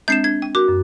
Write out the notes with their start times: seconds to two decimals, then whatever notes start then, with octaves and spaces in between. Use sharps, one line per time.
0.08 G#3 C4 D4 G6 C7 E7
0.24 D4 G#6
0.42 G5
0.55 F#4 A#4 D6
0.68 F#2